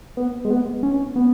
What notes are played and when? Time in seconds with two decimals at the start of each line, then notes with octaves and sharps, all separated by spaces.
0.17 B3
0.45 G#3
0.50 B3
0.83 C#4
1.16 B3